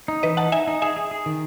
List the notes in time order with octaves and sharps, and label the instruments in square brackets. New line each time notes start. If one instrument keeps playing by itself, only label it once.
[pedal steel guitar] D#4
[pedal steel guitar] E3 [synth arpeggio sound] B4 D#5
[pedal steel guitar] D#4 [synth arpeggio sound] F#5 A5
[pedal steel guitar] D#4 [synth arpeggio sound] E5 G#5
[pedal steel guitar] D#4
[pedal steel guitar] G#4 [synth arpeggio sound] E5 G#5
[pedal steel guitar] G#4
G#4
D#3